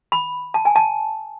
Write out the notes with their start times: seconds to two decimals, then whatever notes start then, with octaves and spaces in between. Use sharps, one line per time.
0.12 B5
0.54 A5
0.65 G#5
0.76 A5